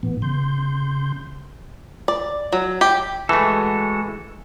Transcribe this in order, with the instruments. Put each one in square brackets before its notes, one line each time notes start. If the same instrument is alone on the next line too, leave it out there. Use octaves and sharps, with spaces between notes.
[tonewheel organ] A2 E3 B3
C#3 C6 G6
[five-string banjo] D5
F#3
G4
[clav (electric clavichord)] E3 A3 [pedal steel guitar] G#3 F#4 A4